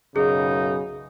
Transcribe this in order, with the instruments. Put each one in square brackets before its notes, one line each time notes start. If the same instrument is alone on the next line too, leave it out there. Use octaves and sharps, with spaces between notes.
[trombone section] B1 F#2 C#3 [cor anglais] D#4 [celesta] G#4